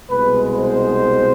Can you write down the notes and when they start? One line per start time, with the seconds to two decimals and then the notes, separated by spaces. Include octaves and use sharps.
0.10 C2 B2 G#3 B4
0.57 C5